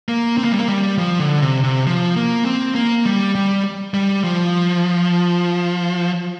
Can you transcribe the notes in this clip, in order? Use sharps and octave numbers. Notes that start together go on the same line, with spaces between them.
A#3
C4
A#3
G3
A#3
G3
F3
D3
C3
C3
F3
A#3
C4
A#3
G3
G3
G3
F3